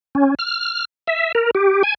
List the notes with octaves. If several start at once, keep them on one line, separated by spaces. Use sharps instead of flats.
C#4
F6
E5
A#4
G4
G#5